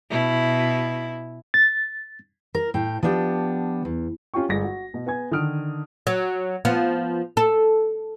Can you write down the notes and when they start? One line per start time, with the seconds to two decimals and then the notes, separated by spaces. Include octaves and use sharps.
0.10 B2 E4
1.54 A6
2.55 A#4
2.74 A2 G5
3.03 F3 B3 D4 G4
3.85 E2
4.34 C#4 F4 G4 G5 C#6
4.49 G1 G#3 A#6
4.64 F#4
4.94 B2
5.06 B3 G#5 G#6
5.31 D3 D#3 D#6 F6 D7
6.07 F#3
6.65 F3 B3
7.37 A4